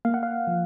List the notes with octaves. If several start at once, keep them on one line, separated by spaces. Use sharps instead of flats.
A#3 F5
F#5
F5
F3